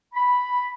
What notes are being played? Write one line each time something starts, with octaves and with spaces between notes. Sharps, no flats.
B5